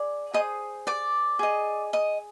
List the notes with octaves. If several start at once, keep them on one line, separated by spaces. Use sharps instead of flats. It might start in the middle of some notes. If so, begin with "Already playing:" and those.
Already playing: G#4 D5
G#4 C5 D#5 D#6
D5 D6
G#4 D#5
D#5 D#6